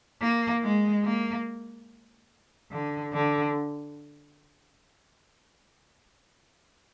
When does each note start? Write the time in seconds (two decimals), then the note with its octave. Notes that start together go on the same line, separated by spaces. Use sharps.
0.21 A#3
0.63 G#3
1.04 A#3
2.71 D3
3.13 D3